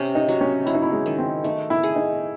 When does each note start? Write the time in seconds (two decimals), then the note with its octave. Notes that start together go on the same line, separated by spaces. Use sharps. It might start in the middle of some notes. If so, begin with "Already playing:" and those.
Already playing: C3 C#4
0.15 D#4
0.28 F#3
0.41 C#4
0.66 F#3 E4
0.75 D#4
0.83 E4
0.92 G#3
1.06 D#3
1.18 C4
1.44 A3 D#4
1.70 E4
1.83 G#4
1.96 D#4